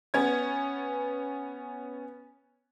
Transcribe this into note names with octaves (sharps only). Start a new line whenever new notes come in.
B3 C#4 G#6